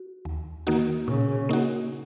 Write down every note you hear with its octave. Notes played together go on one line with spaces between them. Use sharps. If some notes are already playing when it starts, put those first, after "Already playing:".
Already playing: F#4
D#2
D#3 A#3 D#4 F#4
A#2 C#3
A#3 D#4 F#4